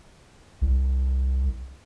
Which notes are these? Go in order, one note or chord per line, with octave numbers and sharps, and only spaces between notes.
C2